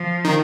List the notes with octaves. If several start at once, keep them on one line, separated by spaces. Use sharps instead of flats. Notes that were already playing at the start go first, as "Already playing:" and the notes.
Already playing: F3
D#3